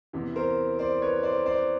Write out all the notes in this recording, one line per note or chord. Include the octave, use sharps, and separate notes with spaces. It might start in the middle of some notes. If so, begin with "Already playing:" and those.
E2 C3 E3
A#4 C5
C5 D5
B4 C#5
C5 D5
C5 D5